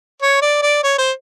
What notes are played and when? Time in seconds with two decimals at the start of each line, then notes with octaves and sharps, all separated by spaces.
0.22 C#5
0.42 D5
0.62 D5
0.84 C#5
0.98 C5